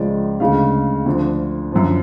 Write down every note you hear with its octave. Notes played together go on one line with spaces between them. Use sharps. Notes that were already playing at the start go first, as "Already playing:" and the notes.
Already playing: C#2 C#3 F3 G#3 D5
D2 C#3 G#3 F5
D2 D3 F3
F#2 D3 F3